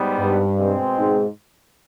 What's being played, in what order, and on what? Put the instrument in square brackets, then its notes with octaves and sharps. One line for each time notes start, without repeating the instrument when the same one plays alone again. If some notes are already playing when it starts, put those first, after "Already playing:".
Already playing: [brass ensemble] G#2 G3 B3
[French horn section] G2
[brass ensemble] B2 G#3 C4
[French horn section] G#2